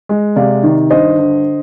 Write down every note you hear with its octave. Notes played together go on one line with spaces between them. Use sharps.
G#3
C3 D5 F5
D#3
G2 C5 D#5
D3